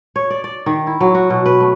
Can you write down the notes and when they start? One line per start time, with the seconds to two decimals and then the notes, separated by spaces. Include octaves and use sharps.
0.16 C#5
0.30 D5
0.44 D5
0.66 D#3
0.87 E4
1.01 F#3
1.15 F#4
1.30 B2
1.46 B4
1.60 A3